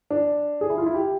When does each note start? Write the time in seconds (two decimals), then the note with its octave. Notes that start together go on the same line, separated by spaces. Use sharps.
0.11 D4
0.61 G#4
0.70 E4
0.78 F4
0.86 E4
0.95 G4